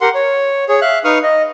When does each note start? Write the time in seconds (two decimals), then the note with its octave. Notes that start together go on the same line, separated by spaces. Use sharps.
0.01 G4 A#4 F#5 C6
0.15 C#5
0.69 G#4 C#5
0.82 E5 F5 F#6
1.04 D#4 B4 F5 C#6 D#6 F6
1.23 D#5